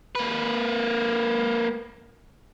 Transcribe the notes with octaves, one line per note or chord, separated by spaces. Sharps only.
A#3 B4